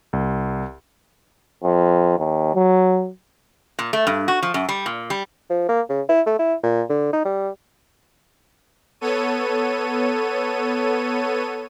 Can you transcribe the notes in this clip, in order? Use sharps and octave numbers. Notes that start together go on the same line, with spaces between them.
C2
F2
D#2
F#3
A#2
A3
G2
F#4
F3
F#2
G3
A#2
G3
F3
A#3
C#3
E4
A3
E4
A#2
D3
D#4
G3
B3 A4 C#5 D#7